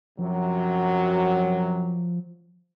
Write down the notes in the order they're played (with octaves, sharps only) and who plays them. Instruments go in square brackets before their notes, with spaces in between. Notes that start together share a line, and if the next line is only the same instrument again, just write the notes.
[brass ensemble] F#2 C3 F#3 [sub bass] F3